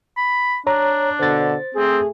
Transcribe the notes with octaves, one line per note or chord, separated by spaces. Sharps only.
B5
D4 C#5 A#5
B2 D3 C5 A6
A3 C4 G#4